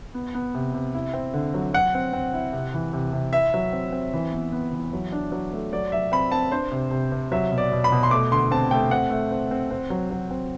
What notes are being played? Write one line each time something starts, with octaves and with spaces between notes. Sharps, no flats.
B3
B3
C3
C3
E4
C4
D3
F#3
F#3 F#5
C4
C4
E4
C3
E3
C3
C3
E4 E5
F#3
C4
C4
E3
B3
B3
E3
F#3
D4
F#3
A3
F#3 D5
F#3 E5
C4 B5
C4 A5
D4 C5
C3
C3
C3
F#3 E5
B2
D5
B2
B5
B2
C6
A3 D6
D3 C6
C4 A5
A3 G5
C4 F#5
A3
C4
C4
C4
F#3
F#3
C4